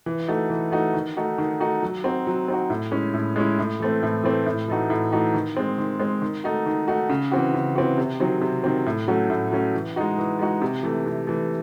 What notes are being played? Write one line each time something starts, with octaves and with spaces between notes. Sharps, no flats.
E3
A3 D#4 F#4
E3
A3 D#4 F#4
D#3
A3 D#4 F#4
D#3
A3 D#4 F#4
F#3
C4 D#4 F#4
F#3
C4 D#4 F#4
A2
G#3 C#4 E4
A2
G#3 C#4 E4
A2
E3 A3 C4
A2
E3 A3 C4
A2
E3 A3 D#4 F#4
A2
E3 A3 D#4 F#4
D#3
G#3 C4
D#3
G#3 C4
D#3
A3 D#4 F#4
D#3
A3 D#4 F#4
C#3
E3 C4 F#4
C#3
E3 C4 F#4
C3
D#3 F#3 C4
C3
D#3 F#3 C4
A2
F#3 A3 C#4 F#4
A2
F#3 A3 C#4 F#4
E3
G#3 D#4 F#4
E3
G#3 D#4 F#4
C3
E3 A3
C3
E3 A3